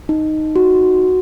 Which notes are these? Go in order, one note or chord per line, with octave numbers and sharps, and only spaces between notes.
D#4
F#4